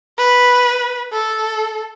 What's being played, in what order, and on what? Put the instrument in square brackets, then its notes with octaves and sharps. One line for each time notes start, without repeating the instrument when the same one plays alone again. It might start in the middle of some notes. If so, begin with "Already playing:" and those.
[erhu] B4
A4